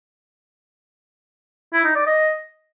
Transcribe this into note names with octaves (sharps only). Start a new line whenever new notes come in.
E4
D#4
D5
D#5